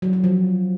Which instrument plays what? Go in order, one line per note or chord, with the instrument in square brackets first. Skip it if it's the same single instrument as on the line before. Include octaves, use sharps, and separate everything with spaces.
[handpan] F#3
F#3
F3